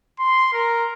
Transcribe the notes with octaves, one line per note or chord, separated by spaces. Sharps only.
C6
A#4